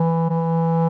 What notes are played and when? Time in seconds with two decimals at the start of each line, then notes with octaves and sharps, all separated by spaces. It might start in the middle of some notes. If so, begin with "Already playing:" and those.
Already playing: E3
0.30 E3